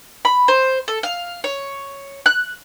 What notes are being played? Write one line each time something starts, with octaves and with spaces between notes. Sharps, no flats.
B5
C5
A4
F5
C#5
F#6